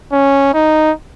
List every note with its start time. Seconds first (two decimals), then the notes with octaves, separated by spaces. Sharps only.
0.12 C#4
0.54 D#4